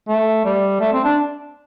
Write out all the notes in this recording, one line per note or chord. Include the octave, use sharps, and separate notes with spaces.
A3
G3
A3
C4
D4